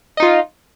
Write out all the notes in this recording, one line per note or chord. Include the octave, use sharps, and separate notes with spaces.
D#4 F4 D#5